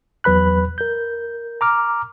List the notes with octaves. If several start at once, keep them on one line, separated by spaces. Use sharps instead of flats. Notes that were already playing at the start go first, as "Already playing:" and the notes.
E2 F#3 B4 B5 F#6
A#4 G6
A#5 D6 F6